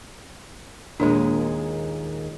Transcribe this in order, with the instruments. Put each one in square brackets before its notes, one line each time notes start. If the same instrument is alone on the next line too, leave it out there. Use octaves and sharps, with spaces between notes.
[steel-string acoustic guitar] D#2 A#2 G#3 [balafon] D4